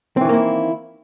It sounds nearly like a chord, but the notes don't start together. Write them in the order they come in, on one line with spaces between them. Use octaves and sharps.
C4 E3 D#3 A#3 E4